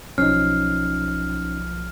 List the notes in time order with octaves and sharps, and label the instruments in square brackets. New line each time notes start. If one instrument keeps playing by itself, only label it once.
[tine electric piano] B1 F3 C7 [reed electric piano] C#4 D#4 [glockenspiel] F6